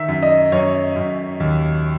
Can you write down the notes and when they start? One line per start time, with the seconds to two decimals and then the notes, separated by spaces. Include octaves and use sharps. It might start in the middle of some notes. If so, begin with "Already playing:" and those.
Already playing: D#3 E5
0.08 F#2
0.23 D#5
0.52 F#2 C#5
0.96 F#2
1.40 D#2